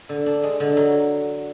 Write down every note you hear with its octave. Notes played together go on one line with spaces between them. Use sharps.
D3
D4
G#3
D3
F#3